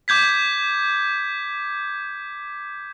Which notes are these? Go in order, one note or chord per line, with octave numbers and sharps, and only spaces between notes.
D6 G6 G#6 B6